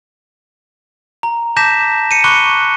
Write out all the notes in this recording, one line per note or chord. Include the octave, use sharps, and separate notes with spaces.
A#5
A5 D6 G6 A#6 B6 E7
C#7 D#7
B5 C#6 D6 F#6 C#7 G7